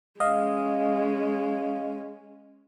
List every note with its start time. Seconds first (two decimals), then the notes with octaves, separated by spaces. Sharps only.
0.20 G#3 C#4 D#5 F5